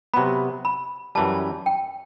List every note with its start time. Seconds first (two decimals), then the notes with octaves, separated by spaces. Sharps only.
0.14 C3 F#3 B3 B5
0.65 B5
1.15 F#2 E3 G3 A5
1.66 G5